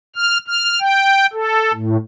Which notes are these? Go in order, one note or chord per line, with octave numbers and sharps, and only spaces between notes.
F6
F6
G5
A4
A2